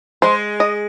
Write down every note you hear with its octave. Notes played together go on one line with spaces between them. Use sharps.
G#3 C5
D#5